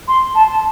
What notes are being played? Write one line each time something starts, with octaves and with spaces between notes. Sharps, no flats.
C6
A5